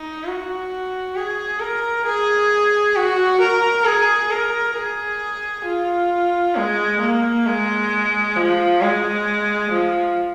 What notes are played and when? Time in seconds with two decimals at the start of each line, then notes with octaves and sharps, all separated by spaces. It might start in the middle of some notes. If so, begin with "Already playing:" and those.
Already playing: D#4
0.25 F#4
1.16 G#4
1.60 A#4
2.05 G#4
2.96 F#4
3.41 A#4
3.85 G#4
4.31 A#4
4.76 G#4
5.65 F4
6.56 G#3
7.01 A#3
7.46 G#3
8.37 F3
8.82 G#3
9.72 F3